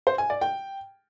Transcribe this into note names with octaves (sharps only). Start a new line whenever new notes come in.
C5
G#5
D5
G5